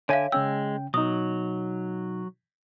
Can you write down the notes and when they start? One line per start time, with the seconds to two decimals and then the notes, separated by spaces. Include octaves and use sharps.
0.09 D3 C#5 E5 F5 G#5
0.32 C#3 G#3 C#4 G5 E6
0.94 B2 F#3 D#4 D#6